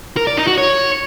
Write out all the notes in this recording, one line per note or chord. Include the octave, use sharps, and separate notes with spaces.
A#4
D5
D#4
F#4
C#5